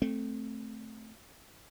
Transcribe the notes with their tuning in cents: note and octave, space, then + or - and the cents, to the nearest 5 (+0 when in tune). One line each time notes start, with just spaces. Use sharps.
A3 -5 C4 +0